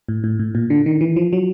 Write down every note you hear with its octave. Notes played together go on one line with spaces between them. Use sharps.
A2
A2
A2
A#2
D3
D#3
E3
F3
F#3